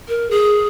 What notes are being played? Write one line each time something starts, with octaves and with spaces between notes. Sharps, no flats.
A#4
G#4